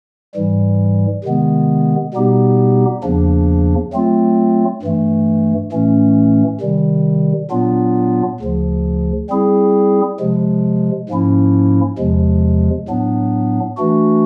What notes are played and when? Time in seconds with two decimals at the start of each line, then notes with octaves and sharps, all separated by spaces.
0.35 G#2 E3 G3
1.24 C3 D#3 G#3 B3
2.14 B2 G3 B3 D#4 G4
3.03 E2 C#3 F3 A#3 D4
3.93 F#3 A3 C4 F4
4.82 G2 E3 A3
5.72 A2 E3 A3 C#4
6.61 C3 D#3 G3
7.51 A#2 F#3 B3 D4 F4
8.40 D2 C#3 F3
9.30 G3 C4 E4 G#4
10.20 C3 F3 G#3
11.09 G#2 F3 A#3 C#4 E4
11.98 E2 C3 F3 G#3
12.88 A2 F#3 B3 D4
13.77 E3 A3 D4 F#4